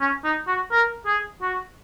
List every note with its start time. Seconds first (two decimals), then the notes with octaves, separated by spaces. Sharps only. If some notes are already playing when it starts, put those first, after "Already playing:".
0.01 C#4
0.24 D#4
0.47 F#4
0.71 A#4
1.06 G#4
1.42 F#4